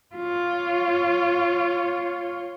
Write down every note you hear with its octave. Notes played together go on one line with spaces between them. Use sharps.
F4 C#5